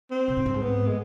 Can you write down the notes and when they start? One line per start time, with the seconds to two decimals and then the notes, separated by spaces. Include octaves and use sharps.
0.11 C4
0.28 C3
0.37 G#2
0.46 G2
0.54 G#2
0.62 B3
0.87 G#3